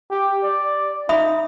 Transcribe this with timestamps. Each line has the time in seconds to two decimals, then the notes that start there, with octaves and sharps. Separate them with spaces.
0.11 G4
0.43 D5
1.09 D#4 E5 B5 D#6